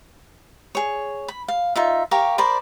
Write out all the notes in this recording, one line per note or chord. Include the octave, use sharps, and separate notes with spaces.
G#4 C#5
B5
F5
D#4 F4 E5
G4 A#4 F5 C#6
A#4 C5 D5 B5